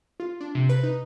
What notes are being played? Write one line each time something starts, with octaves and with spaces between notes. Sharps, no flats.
F4
D4
C3
B4
D#4